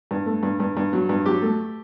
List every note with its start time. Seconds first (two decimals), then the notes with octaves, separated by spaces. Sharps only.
0.11 G2
0.26 A3
0.43 G2
0.60 G2
0.77 G2
0.93 F#3
1.09 G2
1.26 F#3 G4
1.42 A3